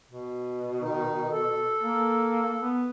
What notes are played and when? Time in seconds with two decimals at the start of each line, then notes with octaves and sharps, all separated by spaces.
0.11 B2
0.81 D#3 D#4
1.31 A4
1.83 A#3
2.62 B3